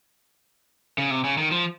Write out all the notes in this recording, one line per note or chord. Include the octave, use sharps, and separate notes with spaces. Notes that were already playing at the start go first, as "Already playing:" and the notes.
C#3
C3
C#3
D#3
F3